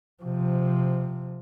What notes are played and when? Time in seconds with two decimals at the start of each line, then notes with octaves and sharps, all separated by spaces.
0.23 C3 F3